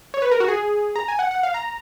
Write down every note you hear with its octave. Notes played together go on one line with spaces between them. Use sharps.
C#5
B4
A#4
F#4
G#4
A#5
G#5
F#5
F#5
F5
A#5